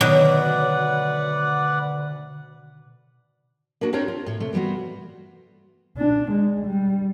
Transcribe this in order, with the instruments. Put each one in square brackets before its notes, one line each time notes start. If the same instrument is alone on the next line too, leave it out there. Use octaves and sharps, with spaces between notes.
[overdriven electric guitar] D2 [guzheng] B2 D#3 F#3 [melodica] B4 D5 F#5
[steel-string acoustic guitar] A#3 D4 F#4
C4 D4 F4 G4 A#4 C#5
F4
A2 C#5
C3 A3
E3 G3 B3 F4 F#4
[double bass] D4
G#3
G3